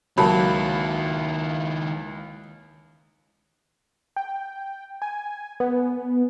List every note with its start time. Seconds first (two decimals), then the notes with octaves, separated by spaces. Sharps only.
0.18 C#2 D#3 F#3 A#3 E4 A5 B5
4.16 G5
5.02 G#5
5.60 B3